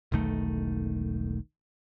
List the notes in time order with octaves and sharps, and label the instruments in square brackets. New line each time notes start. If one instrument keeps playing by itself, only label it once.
[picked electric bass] E1 B1 D#3 A3